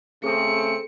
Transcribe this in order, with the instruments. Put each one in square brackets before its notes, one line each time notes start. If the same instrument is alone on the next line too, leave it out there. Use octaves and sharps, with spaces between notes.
[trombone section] C#3 A3 C4 [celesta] G#4 A4 [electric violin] C#7